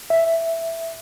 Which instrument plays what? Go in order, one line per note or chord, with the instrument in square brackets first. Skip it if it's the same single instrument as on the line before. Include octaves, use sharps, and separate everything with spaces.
[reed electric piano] E5